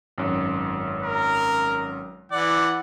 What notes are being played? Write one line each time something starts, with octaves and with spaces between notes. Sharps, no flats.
G#1 F#2
A#4
E3 D5 F#5